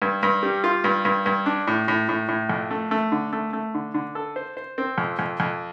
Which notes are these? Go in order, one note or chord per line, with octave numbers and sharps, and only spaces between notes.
G2
G2
G3
F4
G2
G2
G2
D4
A2
A2
A2
A2
F2
A3
A3
D3
A3
A3
D3
D3
A4
C5
C5
C4
F2
F2
F2